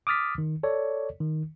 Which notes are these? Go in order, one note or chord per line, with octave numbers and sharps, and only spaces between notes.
D6 D#6 F6 A6 B6
D#3
A4 C#5 D5
D#3